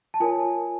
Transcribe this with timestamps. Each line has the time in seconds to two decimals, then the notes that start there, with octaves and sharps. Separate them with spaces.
0.14 A5
0.20 F4 A#4 C#5 G#5